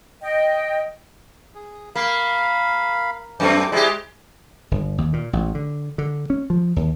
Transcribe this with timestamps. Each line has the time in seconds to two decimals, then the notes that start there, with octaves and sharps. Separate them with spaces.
0.22 D#5 G5
1.55 G#4
1.96 A#3 F5 B5
3.40 F#2 A3 C4 G5 D6
3.72 G#3 E4 G4 C5 D5
4.71 G1
4.98 D#2
5.13 A#2
5.33 A1
5.55 D3
5.98 D3
6.30 C#4
6.50 F3
6.76 D#2